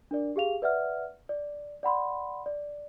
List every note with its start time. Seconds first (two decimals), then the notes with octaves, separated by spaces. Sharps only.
0.11 D4 A#4 D5
0.36 G4 G#4 F5 F7
0.62 B4 D5 E5 F#5 F6
1.29 D5
1.83 D5 F#5 B5 C6
2.46 D5